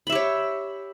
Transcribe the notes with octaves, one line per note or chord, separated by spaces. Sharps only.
G4 C#5 E5 B5